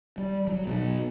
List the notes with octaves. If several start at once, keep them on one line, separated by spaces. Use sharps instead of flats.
G3
F#3
B2 F#3